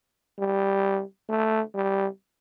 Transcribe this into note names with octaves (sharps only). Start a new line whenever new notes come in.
G3
A3
G3